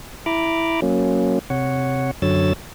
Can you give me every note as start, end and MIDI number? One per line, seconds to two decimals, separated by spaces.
0.26 0.80 64
0.26 0.80 82
0.26 0.80 83
0.26 0.80 86
0.82 1.39 54
0.82 1.39 58
0.82 1.39 61
1.50 2.11 48
1.50 2.11 73
1.50 2.11 78
2.22 2.53 42
2.22 2.53 50
2.22 2.53 54
2.22 2.53 73
2.22 2.53 88
2.22 2.53 93